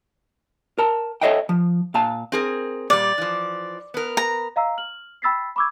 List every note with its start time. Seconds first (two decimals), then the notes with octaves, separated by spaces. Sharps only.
0.78 A#4 A5
1.22 A4 C#5 D#5 E5 F#5 G5
1.49 F3
1.94 A#2 F5 A5
2.32 C4 G#4 A#4
2.90 A#2 G3 D5
3.18 E3 F3
3.94 B3 A#4
4.17 A#5
4.56 D#5 F5 A#5 E6 C7
4.77 F6 F#7
5.22 G5 B5 E6 A6 B6 C7
5.56 B5 C#6 D6 E6 G#6